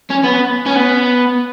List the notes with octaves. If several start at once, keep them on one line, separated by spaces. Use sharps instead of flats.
C#4
B3
C#4
B3